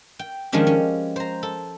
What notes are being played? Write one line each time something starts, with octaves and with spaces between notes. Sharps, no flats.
G5
D#3 F3 G#3 C#4 D4 G4
C#4
C5 A#5
A4